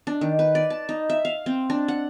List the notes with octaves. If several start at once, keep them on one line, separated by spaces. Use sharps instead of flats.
D4
D#3
B4
D5
A5
D#4
E5
F5
C4
D4
F#5